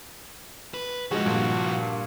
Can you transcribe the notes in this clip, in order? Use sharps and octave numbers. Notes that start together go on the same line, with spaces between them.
B4
F3 G#3 E4 F#4 G#4
G2 A#2